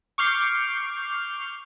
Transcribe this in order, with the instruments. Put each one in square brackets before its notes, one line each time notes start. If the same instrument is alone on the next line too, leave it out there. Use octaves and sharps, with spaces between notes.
[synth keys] C#6 D6 F6 G6 C7